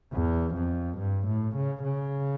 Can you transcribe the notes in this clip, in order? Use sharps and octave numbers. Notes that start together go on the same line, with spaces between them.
E2
F2
G2
A2
C#3
C#3